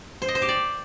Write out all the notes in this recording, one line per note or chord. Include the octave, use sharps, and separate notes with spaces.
C5
D#5
C5
G4
D5